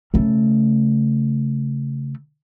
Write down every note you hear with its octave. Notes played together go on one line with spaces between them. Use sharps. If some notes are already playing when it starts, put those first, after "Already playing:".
C#3 A3